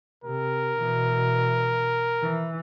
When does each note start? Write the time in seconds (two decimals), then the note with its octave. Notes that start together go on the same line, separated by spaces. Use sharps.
0.24 C3 A#4
0.77 B2 E3
2.21 E3